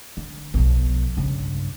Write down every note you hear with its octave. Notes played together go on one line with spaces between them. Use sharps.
D3
B1 F3
G2 C#3